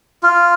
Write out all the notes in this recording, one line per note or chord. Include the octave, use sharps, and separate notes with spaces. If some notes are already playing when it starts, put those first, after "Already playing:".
F4